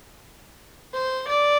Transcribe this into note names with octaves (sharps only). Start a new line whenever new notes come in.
C5
D5